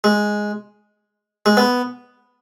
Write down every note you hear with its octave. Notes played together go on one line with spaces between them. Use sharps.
G#3
G#3
B3